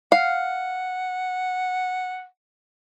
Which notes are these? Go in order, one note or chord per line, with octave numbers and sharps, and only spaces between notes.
F5 F#5